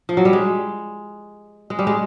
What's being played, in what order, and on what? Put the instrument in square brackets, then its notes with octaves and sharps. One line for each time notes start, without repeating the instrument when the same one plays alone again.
[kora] F3
F#3
G3
G#3
G#3
G3
G#3